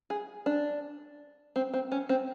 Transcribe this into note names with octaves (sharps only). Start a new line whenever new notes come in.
G#4
D4
C4
C4
C#4
C4